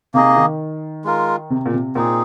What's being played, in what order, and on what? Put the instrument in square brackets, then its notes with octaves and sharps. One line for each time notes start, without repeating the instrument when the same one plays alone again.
[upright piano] C3 [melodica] A#3 D#4 G#4 D#5
[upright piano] D#3
[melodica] G#3 F4 A#4
[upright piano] C3
A#2
C3
[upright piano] A#2 [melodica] C4 D#4 G#4